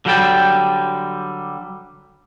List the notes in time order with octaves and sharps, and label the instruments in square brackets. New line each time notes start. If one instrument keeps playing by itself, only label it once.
[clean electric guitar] D3 F#3 G3 F#5 G5 A5